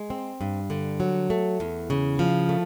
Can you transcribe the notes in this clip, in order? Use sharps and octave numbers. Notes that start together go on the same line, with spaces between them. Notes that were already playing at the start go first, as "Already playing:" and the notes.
Already playing: G#3
C4
G2
D3
F#3
A3
E2
C#3
F3
A3